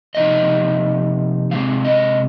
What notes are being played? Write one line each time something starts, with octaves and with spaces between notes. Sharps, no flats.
C3 F3 A#3 D#4 D#5
C3 G#3 C4 F5
D#5